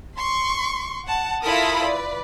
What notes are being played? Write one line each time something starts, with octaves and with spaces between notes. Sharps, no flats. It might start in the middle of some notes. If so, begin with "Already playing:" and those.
C6 C#6
F#5 A5
E4 F4 A4 A#4 B5 D#6
B4 D5